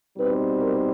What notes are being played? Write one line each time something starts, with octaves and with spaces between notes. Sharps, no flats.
B2 G3 C4 D#4 B4
A#4